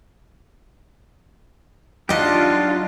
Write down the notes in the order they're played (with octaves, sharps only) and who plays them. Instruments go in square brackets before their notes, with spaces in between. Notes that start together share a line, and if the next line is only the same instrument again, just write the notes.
[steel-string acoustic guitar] F#3 D#5 [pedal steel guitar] D4 D#4 G4 [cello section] F4